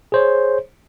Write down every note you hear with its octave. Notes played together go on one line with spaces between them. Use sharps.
G#4 C5 C#5